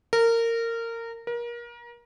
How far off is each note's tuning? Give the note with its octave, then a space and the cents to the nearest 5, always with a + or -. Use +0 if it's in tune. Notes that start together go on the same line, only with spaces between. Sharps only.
A#4 -20
A#4 +30